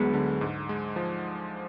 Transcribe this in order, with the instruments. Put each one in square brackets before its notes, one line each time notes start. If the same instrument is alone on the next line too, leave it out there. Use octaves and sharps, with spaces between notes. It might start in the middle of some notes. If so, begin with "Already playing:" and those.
Already playing: [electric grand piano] D2 F#3 [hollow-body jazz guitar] G#3 B3
[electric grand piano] D3
G#2
G#3
F3